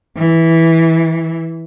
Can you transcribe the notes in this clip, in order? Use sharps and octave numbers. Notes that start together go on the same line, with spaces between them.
E3